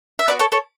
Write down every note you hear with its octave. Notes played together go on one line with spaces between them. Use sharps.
E5
B3 D4 F#4 B4 D5
A4 C#5
A4 C#5